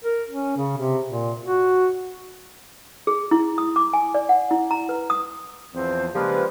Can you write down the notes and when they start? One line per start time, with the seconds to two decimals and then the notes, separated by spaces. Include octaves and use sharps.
0.04 A#4
0.30 C#4
0.57 C#3
0.77 C3
1.09 A#2
1.45 F#4
3.07 G#4
3.31 E4
3.58 D#6
3.76 D6
3.93 G#5
4.15 D5
4.29 F#5
4.51 E4
4.71 A#5
4.89 B4
5.10 D#6
5.73 E2 F3 C4
6.14 C#3 F3 G3 G#3 A#3 B4